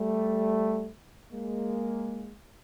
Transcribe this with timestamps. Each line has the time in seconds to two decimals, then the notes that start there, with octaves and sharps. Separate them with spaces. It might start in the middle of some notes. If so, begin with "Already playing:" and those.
Already playing: G3 A3
1.33 G#3 A#3